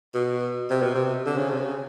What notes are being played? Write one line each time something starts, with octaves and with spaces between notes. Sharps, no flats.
B2
C3
B2
C3
D3
C#3
C3
C#3